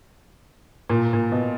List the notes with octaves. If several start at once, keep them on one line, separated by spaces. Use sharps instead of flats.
A#2
A#2
B2